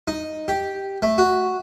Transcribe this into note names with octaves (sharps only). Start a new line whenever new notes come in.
D#4
G4
A3
F#4